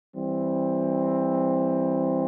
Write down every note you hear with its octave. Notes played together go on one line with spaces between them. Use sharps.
E3 G3 C4